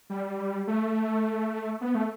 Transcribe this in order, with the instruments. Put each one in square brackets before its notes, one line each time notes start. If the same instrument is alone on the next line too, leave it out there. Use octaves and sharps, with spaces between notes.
[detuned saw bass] G3
A3
B3
A3